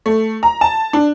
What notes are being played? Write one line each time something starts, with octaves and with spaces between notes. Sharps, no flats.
A3
A#5
A5
D4